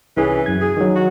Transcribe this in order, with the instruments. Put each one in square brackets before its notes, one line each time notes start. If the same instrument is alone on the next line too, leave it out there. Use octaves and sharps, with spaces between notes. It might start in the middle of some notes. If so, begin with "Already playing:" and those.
[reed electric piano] C2 C#4 G#4 [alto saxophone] E3
[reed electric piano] F#2 G#6
[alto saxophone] G#4
[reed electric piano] D#3 F#3
[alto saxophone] F#4